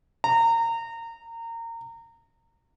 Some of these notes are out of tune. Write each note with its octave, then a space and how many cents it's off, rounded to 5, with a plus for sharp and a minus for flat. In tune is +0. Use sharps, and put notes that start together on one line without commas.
A#5 -25